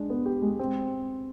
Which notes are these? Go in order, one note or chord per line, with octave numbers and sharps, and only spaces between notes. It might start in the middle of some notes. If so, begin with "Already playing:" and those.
Already playing: G#3 D4
B3
G4
G#3
C4